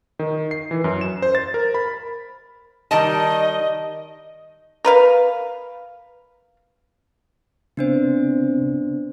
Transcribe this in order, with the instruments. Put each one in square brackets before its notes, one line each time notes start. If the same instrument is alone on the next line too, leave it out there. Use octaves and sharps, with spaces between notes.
[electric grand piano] D#3
C7
E3
F#2
E7
C5
A6
A#4
B5
[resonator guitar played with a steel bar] D#3 G3 A5 [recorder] D#5
[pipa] A#4 B4 F5
[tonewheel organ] C#3 C4 [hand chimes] B3 D4 C5